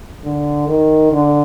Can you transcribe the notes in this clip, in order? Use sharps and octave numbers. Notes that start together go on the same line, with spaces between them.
D3
D#3
D3